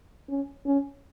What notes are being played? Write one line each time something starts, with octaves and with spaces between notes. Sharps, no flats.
C#4
C#4